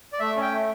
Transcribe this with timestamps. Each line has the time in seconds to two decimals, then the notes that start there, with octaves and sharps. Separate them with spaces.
0.13 D5
0.20 A3 E5
0.36 C#4
0.41 G5
0.52 A3